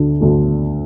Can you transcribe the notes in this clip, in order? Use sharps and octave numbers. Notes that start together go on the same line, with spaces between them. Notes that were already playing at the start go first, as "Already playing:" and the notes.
Already playing: D2 D3 A3
D2 D3 A3